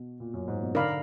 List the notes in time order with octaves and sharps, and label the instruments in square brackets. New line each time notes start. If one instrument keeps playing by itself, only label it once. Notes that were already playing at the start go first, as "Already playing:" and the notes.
Already playing: [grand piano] B2
A#2
F#2
G#2
B2
[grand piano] D3 [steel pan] D#4 A#4 D5 F5 B5